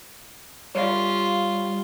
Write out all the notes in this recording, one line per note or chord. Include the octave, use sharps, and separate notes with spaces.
G3 F4 C#5 D5 F5